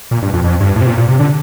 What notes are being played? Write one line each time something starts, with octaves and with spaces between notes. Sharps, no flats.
A#2
G2
F2
F2
G2
A2
C3
A#2
A#2
C3
D3